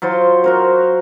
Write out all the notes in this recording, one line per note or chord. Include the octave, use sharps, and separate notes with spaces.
F#3 F4 C5 C6
F#4 A#4 C5